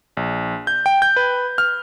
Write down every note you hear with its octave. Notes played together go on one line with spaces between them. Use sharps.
A#1
G6
G5
G6
B4
F6